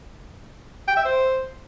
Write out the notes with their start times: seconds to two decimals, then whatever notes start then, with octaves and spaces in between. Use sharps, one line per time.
0.88 G5
0.97 E5
1.05 C5